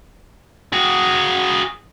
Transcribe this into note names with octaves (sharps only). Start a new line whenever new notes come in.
F#4 G#4